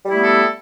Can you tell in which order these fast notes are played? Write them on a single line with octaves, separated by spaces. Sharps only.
G3 E4 A3 B3 A4